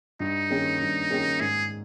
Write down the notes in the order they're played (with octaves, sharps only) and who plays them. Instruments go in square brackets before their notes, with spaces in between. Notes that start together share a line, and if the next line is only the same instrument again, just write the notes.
[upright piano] G2 [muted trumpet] D#4
[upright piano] D#3 A#3 C#4 G#4
G2
D#3 A#3 C#4 G#4
[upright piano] G#2 [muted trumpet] G#4